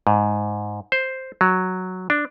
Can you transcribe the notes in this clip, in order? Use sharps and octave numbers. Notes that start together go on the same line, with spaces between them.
G#2
C5
F#3
D4